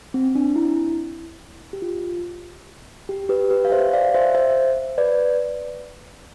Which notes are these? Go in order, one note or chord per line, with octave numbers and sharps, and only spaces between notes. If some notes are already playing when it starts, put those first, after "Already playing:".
C4
D4
E4
G4
F4
G4
G4 B4
G4 B4
F5
C5 E5
D5 F5
C5 E5
C5 E5
B4 D5